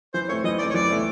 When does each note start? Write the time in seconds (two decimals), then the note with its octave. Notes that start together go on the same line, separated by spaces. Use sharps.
0.14 E3 C5
0.29 A3 C4 C#5
0.44 E3 D#5
0.59 A3 C4 D5
0.70 C#5
0.74 E3 D5
0.89 A3 C4